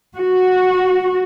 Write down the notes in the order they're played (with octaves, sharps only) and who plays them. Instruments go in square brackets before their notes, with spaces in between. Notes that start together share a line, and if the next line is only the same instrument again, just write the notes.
[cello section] F#4